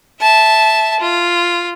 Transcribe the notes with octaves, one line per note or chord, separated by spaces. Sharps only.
E5 A5
F4